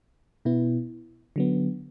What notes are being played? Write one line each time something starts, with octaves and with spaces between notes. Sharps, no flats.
B2 B3 E4
D3 F#3 B3